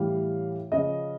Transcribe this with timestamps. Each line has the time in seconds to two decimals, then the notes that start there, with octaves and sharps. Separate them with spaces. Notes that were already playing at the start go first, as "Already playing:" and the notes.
Already playing: A2 E3 G3 F5
0.71 C#3 F3 D#5